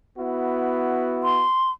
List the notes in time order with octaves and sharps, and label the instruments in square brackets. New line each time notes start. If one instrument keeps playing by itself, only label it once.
[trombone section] B3 E4 F#4
[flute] C6